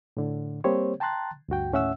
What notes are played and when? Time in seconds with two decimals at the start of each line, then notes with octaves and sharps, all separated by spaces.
0.17 A2 D3
0.64 G3 A#3 C4 G4 C5 C#5
1.00 G5 A5 A#5 C6 F#6 A6
1.49 D2 G2 F#4 G5
1.72 D#2 A2 C#4 E5 F#5 E6